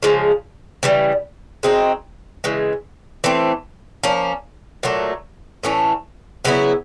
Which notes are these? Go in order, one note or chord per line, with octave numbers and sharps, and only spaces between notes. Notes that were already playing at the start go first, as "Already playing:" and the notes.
C#3 F3 G#3
C#3 E3 G3
G#3 C4 D#4 F#4
C#3 E3 G#3
E3 A3 C4
F3 A#3 C#4
A#2 F#3 A3
A2 E3 A3 C#4
C#3 F#3 B3 E4